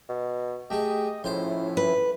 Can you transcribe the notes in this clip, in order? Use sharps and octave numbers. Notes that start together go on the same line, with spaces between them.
B2
A3 G4 G#4 D#5
A2 F3 C#4 E4 C5 C6
B4